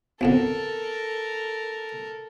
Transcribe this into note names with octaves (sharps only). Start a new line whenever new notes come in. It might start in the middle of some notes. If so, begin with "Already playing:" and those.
B1 F2 D3 A4 A#4